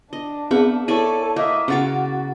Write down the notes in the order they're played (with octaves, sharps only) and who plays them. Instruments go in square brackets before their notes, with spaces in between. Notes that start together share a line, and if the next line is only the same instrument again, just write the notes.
[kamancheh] D4 [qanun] D#5
[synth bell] B3 C4 G#4 [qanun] B4 E5
[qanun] E4 D5 E5 [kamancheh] A4 C#5 [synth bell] C#6 D#7
[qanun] A#3 [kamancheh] D#5 E5
[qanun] C#3 C#6 D6 [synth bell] C#4 F#5 A6 [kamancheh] F#4